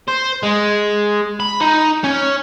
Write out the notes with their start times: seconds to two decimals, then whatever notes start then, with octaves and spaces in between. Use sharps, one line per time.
0.08 C5
0.43 G#3
1.40 B5
1.61 D#4
2.04 C#4